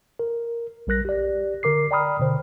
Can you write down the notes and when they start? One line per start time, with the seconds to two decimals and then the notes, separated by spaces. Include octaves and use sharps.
0.19 A#4
0.87 A#1 G3 A#4 F#6 A#6
1.05 G4 D5
1.63 D3 A#4 D6 C7
1.91 D5 G5 A#5 B5 D#6 F6
2.20 B2 D3 C5